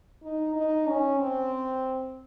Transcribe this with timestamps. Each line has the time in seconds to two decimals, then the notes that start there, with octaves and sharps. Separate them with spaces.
0.23 D#4
0.56 D#4
0.88 C#4
1.20 C4